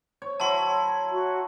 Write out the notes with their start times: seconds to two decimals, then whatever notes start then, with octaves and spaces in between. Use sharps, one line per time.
0.22 C#5
0.40 F#3 E4 A5 C6
1.12 F#4